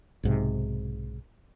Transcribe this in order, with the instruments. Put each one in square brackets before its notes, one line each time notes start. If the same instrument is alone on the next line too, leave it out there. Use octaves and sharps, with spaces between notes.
[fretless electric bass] B1 G#2 C3